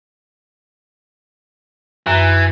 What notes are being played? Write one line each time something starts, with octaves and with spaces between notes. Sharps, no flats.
F#2 E3